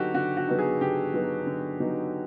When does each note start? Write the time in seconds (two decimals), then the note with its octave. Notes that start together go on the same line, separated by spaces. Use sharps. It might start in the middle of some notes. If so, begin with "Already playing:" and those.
Already playing: D3 F#3 B3 D#4 F#4 G4 A4
0.14 D3 F#4
0.37 F#4
0.48 F#3 B3 D#4
0.59 G#4
0.81 D3 G4
1.14 F#3 B3 D#4
1.47 D3
1.80 F#3 B3 D#4